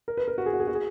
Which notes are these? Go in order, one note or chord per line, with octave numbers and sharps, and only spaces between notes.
A#4
B4
A#4
F#4
G#4
F#4
G#4
F#4
G#4